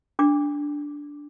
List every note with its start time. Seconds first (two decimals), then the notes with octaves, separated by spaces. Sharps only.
0.19 D4 D6